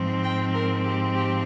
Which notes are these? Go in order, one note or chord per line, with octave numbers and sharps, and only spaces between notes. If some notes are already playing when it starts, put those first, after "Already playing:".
Already playing: G#2 F3 C4
G5
A#4
G4
G4